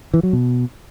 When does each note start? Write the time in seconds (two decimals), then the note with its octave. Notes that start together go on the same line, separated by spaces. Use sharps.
0.14 E3
0.23 F#3
0.33 B2